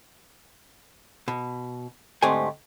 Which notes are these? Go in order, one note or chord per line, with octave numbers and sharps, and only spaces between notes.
B2
D2 G#2 A3 C4 G4 G#5